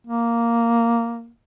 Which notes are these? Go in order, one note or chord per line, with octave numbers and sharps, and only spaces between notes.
A#3